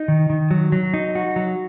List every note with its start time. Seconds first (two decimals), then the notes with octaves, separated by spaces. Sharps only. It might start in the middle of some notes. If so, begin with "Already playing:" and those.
Already playing: D#4
0.08 D#3
0.30 D#3
0.51 F#3
0.72 F#3
0.94 D#4
1.15 F#4
1.36 F#3